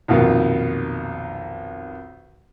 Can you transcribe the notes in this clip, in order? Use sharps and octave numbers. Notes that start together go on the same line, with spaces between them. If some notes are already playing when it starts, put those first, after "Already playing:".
B1 F2 A#2 D#3 F4